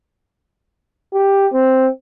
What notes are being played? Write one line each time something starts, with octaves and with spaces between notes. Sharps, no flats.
G4
C4